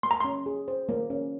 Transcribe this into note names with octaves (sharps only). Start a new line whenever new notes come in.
A#3 C6
A#5
C#4 C6
G#4
C5
A#3
C#4